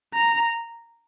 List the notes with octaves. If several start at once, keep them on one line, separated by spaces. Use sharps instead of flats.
A#5